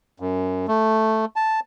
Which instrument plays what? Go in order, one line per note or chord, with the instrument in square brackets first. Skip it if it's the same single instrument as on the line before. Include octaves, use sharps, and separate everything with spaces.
[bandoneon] F#2
A3
A5